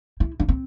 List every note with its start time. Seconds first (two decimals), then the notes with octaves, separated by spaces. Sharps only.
0.20 E4
0.40 D4
0.48 C4